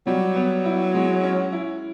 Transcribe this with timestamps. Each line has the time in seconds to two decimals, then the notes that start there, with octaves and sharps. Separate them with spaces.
0.07 F#3 G3
0.36 B3
0.65 E4
0.94 G#3
1.23 C#4
1.52 E4